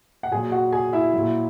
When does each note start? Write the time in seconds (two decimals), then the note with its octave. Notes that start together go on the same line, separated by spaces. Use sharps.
0.23 F#5
0.31 A#2 F#3 G#4 G#5
0.52 F#4 F#5
0.73 G#4 G#5
0.93 E4 E5
1.13 A#2 F#3